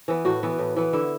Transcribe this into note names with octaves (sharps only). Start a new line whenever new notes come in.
E3 B3
A2 F#4
E3 B3
A2
E3 B3
D3 E4